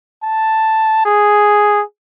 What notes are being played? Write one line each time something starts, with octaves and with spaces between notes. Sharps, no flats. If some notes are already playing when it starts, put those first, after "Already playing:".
A5
G#4